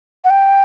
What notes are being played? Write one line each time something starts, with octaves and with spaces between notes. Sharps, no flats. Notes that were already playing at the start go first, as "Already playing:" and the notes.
F#5
G5